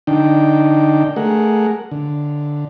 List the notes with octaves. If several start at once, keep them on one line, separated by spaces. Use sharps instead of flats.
D3 D4 D#4 G5
A3 G#4 A#4 F#5
D3